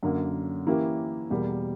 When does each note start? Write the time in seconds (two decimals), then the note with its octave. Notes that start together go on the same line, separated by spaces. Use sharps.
0.03 F#2 D3 A#3
0.67 E3 A#3 C#4 E4 G4
1.30 E2 B2 G3 A#3